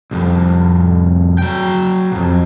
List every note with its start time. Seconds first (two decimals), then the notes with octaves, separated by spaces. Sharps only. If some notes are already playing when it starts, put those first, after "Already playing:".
0.11 C2 F2
1.38 F#3 G5
2.12 B1 F2